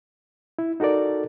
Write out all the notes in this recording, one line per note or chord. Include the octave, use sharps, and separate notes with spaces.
E4
D#4 F#4 A4 A#4 D5